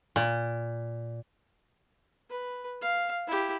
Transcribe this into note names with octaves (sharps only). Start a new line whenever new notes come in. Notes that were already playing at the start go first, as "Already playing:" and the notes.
A#2
B4
F5
E4 G4